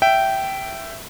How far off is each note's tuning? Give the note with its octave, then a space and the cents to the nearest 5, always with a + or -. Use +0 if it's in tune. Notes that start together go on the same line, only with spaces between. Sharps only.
E5 +10 G5 -15